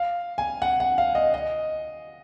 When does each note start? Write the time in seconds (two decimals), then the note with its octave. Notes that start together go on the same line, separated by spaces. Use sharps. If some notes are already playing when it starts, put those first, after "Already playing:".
Already playing: F5
0.38 G#5
0.62 F#5
0.80 F#5
0.98 F5
1.15 D#5
1.34 D#5